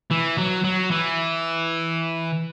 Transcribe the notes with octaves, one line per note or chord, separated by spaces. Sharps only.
E3
F#3
F#3
E3